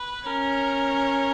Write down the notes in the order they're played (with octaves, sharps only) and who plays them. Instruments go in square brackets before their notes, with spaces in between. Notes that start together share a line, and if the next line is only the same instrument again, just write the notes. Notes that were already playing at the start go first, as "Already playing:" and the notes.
Already playing: [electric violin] B4
[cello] C#4 [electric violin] A#4